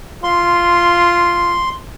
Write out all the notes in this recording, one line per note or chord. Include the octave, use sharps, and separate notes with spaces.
F4 C6